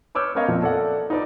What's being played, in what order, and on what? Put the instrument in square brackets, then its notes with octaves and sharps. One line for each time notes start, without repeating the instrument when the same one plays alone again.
[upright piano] B4 C#5 D6 E6 F6 G6
B3 C#4 A#4 C#5 D#5 F5
F2 A#2 F3
A4 D5 E5 F#5
D#4 F4 B4 D5 D6